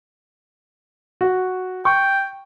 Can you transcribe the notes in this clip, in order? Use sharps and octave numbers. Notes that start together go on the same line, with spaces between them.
F#4
G5 C#6